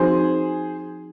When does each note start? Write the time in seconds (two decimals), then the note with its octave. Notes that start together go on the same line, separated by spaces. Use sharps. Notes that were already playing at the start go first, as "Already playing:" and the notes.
Already playing: F3 C4 D#4 F#4 G#4 C5